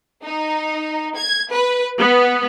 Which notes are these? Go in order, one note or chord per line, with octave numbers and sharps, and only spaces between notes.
D#4
G#6
B4
B3